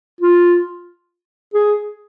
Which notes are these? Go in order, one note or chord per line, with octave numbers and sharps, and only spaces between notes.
F4
G#4